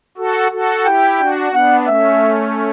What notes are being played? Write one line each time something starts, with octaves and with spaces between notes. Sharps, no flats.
F#4 A4
F#4 A4
E4 G4 G5
D4 F#4
B3 D4 F#5
A3 C#4 E5